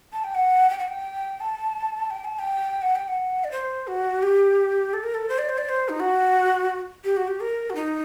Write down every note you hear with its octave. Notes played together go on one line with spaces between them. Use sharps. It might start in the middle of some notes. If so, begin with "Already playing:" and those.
A5
G5
F#5
G5
F#5
G5
A5
G5
A5
G5
F#5
G5
F#5
D5
C5
F#4
G4
A4
A#4
A4
C5
D5
C5
D5
C5
D#4
F#4
G4
F#4
G4
A#4
F#4
D#4